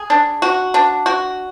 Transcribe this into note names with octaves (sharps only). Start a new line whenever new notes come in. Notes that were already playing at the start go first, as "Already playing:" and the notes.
Already playing: G#4
D4
F#4
D4
F#4